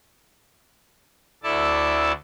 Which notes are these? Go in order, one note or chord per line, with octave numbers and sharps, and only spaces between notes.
D2 E4 A4 D5 A5